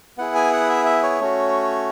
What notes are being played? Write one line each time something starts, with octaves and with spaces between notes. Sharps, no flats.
B3 E4 G#4 F#5
G#5
F#5
E5
E5
C#5
A3 C#4 F#4